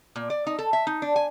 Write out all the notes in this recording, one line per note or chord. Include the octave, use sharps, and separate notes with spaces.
A#2
D5
D#4
A4
E5
D#4
D4
G#5